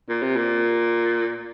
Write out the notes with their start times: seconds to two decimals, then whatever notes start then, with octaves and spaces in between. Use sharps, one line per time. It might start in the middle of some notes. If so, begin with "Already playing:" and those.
0.09 A#2
0.23 C3
0.37 A#2